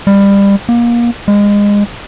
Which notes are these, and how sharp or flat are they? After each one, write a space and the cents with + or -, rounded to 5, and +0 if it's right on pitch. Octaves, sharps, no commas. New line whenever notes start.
G3 +25
A#3 +30
G#3 -25